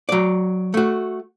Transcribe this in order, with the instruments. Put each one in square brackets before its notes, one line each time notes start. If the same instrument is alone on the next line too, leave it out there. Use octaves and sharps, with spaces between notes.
[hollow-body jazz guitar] F#3 D5
A3 F#4